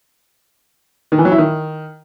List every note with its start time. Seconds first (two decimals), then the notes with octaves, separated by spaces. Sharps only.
1.12 D#3
1.18 E3
1.25 F#3
1.32 E4
1.38 D#3